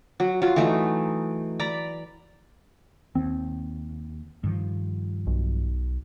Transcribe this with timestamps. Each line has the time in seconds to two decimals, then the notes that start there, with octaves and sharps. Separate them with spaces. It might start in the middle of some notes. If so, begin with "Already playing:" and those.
0.20 F#3
0.42 F#3 F4
0.56 E3 F#3 A3 D#4
1.60 D5 A#5 B5
3.15 D#2 C4
4.44 G2 D#3 F3
5.27 B1